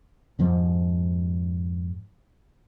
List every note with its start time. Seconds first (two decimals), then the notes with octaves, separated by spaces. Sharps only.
0.39 F2 G#2 F3 G#3